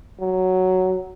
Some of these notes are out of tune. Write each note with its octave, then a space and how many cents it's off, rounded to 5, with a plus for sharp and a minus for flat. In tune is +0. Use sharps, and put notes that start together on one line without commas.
F#3 +5